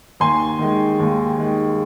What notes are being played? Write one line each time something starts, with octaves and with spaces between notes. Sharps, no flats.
D#2 G#5 C6
D#3 G#3
D#2
D#3 G#3